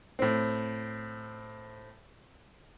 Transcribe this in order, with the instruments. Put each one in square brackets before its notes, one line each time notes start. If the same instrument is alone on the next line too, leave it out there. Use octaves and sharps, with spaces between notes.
[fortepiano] A2 C4